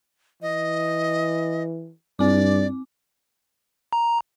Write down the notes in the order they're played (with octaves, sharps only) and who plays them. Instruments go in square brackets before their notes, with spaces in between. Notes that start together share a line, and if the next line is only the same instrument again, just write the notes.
[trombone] E3 [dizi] D#5
[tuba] G2 [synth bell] C4 D6 [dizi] D5
[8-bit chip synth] A#5